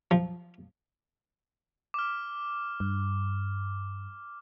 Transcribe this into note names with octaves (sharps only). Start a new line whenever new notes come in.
F3
D6 F6
G2